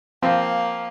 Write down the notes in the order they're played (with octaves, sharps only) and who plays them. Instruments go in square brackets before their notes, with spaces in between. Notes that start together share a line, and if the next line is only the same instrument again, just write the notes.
[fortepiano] F3 C4 [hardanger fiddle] A#3